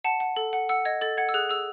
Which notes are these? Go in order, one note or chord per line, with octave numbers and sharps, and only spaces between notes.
F#5 A5
F#5
A4
F#5
F#5 E6
D#5 G#6
A4 A6
F#5 G#6
E6
G#4 F#6
G#4 E6